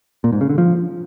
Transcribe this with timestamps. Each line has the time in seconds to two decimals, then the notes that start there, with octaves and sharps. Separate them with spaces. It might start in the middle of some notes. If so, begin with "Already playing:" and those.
0.24 A#2
0.32 G#2
0.41 C#3
0.49 D3
0.58 F3